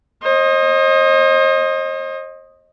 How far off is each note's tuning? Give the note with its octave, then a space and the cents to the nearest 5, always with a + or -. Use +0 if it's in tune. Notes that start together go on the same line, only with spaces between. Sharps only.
C5 +40 D#5 +0